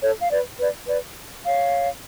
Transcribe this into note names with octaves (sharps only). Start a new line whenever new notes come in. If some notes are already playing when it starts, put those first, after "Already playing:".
A4 C#5
F5
B4 D5
B4 D5
B4 D5
C#5 F5